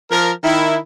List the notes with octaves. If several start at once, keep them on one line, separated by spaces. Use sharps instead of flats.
F3 A#4
D#3 E4